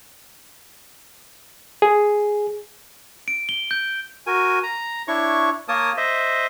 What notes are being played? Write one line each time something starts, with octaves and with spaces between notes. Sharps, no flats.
G#4
D7
G7
G6
F#4 A#4 G#5
A#5
D4 E4 C#5 C#6
A#3 A#4 C#5 A5 D#6
C5 D#5 E5